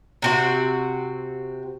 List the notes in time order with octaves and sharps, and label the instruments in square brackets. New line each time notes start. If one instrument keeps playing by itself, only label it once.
[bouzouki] C3 C4 F#4